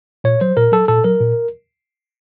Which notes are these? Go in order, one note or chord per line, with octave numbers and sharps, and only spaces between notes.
A#2 C#5
F#3 C5
A#2 A#4
F#3 A4
A#2 A4
F#3 A#4
A#2